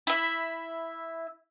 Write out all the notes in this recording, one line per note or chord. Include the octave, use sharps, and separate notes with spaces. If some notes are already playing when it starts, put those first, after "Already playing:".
E4 E5